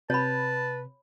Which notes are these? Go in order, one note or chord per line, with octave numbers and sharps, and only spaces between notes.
C3 B4 C#5 A5 B5